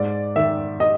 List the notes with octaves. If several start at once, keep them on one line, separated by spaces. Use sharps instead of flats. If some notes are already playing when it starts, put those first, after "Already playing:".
Already playing: G#2 D5
D#3 E5
D#5